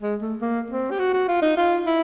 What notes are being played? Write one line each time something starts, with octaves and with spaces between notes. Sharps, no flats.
G#3
A3
A#3
C4
G4
F#4
F#4
F4
D#4
F4
E4